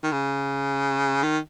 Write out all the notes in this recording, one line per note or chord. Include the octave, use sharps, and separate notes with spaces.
D#3
C#3
D#3